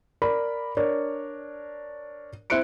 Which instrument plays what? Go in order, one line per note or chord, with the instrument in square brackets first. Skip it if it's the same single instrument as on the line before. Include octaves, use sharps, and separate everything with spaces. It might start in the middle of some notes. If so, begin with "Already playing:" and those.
[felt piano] A#4 D5 B5
D4 A#4 C#5
C4 E4 C5 F#6 C#7 D7